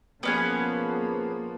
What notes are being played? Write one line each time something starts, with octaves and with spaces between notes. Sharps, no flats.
F3 A#3 B3 C#4 G#4